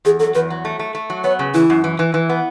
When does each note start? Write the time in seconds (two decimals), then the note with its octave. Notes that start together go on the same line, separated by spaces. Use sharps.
0.05 E2 G#4
0.20 F#3 A4
0.35 E2 B4
0.50 F#3
0.65 A3
0.79 A3
0.95 A3
1.10 F#3
1.24 B3 C#5
1.39 C#3
1.54 E3 E4
1.70 F#2
1.84 E3
1.99 E3
2.14 E3
2.29 B3